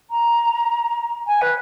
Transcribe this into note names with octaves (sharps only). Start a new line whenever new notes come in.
A#5
G#5
B4